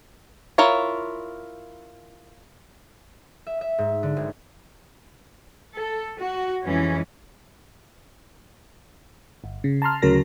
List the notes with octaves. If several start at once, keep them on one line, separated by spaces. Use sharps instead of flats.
E4 F4 A#4 C#5
E5
E5
G#2
D3
G#1
A4
F#4
F2 E3 G#3 C#4
G1
C#3
A5 A#5 C6 F6
D2 C#3 F#3 A#4 A#6